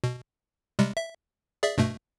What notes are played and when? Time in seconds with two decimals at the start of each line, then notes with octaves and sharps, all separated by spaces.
0.04 B2
0.79 C3 G3 G#3
0.97 E5
1.63 G#4 D5 E5
1.78 G2 B2 A3